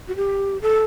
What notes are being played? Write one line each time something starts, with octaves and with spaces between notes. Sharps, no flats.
F#4
G4
A4